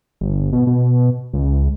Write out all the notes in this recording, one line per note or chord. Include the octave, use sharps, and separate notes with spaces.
G1
B2
B2
C#2